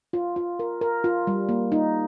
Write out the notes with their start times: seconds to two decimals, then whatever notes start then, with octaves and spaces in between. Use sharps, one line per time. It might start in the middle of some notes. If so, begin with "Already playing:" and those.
0.13 F4
0.36 F4
0.59 A#4
0.81 A#4
1.04 F4
1.27 G3
1.49 A#3
1.72 D#4